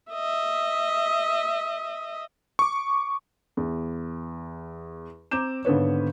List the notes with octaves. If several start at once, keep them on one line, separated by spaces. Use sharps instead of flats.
D#5 E5
C#6 D6
E2
C4 A#5 D6 G6 E7
G#1 D3 B3 B4 C#5